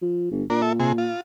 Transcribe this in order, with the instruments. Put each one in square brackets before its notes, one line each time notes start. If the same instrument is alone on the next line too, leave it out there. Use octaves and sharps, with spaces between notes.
[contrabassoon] F3
G1
[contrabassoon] A#2 [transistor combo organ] D4 A#4
[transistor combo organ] A4 E5
C3 G#4
F4